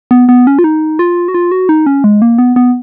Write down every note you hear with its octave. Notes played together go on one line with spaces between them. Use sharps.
B3
B3
C#4
F4
D#4
F4
F#4
F4
F#4
D#4
C#4
G#3
A#3
B3
B3